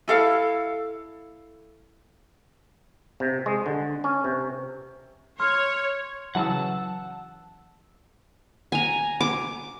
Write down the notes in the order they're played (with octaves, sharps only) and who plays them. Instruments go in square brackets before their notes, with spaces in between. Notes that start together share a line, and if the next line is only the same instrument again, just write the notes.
[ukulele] E4 A4 F5
[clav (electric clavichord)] C3
G#3
D3
C#4
C3
[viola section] C#5 [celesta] C6 F6
[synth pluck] C#3 E3 F#3 [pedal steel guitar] F#5 A5 E6
[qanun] G#5 A#5
D6